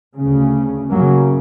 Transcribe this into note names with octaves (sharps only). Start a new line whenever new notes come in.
D2 C#3
F#2 C#3 F#3 A#3